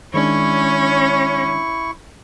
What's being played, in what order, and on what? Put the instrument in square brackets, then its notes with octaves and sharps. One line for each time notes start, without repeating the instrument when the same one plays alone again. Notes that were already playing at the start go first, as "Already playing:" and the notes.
[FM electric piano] D#3 G#3 D4 [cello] C#4 [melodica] E4 C#6